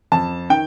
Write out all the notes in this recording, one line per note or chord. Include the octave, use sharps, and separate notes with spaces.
F2 A5
D#3 G5